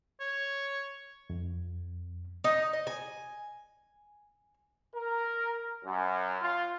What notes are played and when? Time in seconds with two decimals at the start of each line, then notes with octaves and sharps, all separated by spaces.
0.20 C#5
1.30 F2
2.44 D#4
2.73 D#5
2.87 G#5
4.95 A#4
5.85 F#2
6.42 F4